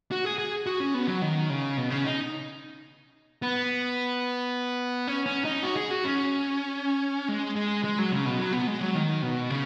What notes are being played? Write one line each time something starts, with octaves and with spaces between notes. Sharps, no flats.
F#4
G#4
G#4
F#4
C#4
B3
F#3
D#3
C#3
B2
C#3
D#4
B3
C#4
C#4
D#4
F#4
G#4
F#4
C#4
G#3
G#3
G#3
F#3
C#3
B2
F#3
B3
G#3
F#3
D#3
B2
C#3